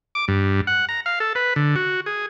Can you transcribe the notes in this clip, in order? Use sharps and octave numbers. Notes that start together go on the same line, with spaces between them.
D6
G2
F#5
A#5
F5
A4
B4
D3
F#4
G#4